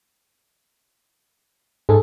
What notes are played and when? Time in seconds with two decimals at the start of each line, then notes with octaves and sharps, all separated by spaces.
1.89 G#2 G#4 A4